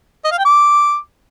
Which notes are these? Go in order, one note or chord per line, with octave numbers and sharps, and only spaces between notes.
D#5
F5
G5
D6